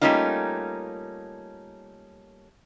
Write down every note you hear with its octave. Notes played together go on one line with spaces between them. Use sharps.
G3 A3 A#3 C#4 D#4 F4